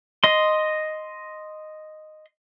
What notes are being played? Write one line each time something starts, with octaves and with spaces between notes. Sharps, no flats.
D#5 C6